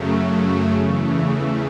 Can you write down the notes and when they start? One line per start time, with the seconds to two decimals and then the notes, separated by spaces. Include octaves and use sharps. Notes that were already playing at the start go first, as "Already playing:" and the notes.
Already playing: F#2 C#3 F#3 A3
0.13 F#4
0.43 F#4
0.72 E2 C#3 E3 A3 A4
1.02 B4
1.32 B4